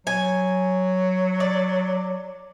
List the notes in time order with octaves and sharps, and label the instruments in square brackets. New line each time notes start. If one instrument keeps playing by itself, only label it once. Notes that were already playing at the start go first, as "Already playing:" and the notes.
[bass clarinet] F#3 [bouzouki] G#5
[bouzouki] D5